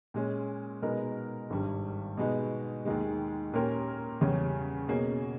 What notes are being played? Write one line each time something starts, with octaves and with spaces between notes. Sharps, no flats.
A#2 G#3 C#4
B2 G#3 B3 D#4 A#4
G#1 G2 G3
B2 G#3 B3 D#4
D#2 D#3 G#3
A#2 A#3 C#4 G4 A#4
E2 C#3 G3 C#4 G4
B2 A#3 C#4 G#4